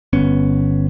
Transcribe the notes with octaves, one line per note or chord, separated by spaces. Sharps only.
G1 B3 C#4